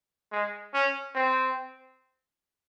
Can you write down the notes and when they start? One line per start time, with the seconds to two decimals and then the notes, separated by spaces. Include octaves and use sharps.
0.32 G#3
0.74 C#4
1.15 C4